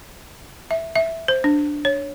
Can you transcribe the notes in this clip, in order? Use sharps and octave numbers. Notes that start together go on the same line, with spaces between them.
E5
E5
C5
D4
C#5